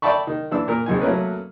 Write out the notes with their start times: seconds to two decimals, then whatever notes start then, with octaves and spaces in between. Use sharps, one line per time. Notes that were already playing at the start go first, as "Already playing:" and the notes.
0.02 D5 E5 G5 A5 B5 C#6
0.27 D#3
0.51 E3 D4 E6
0.68 A#2 A#4
0.86 G#1 D#2 D#3 G#5
1.01 F#3 A3 A#3 C#4 A#4 B4